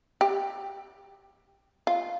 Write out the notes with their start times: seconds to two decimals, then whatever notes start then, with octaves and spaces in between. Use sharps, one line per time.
0.21 G4
1.87 F4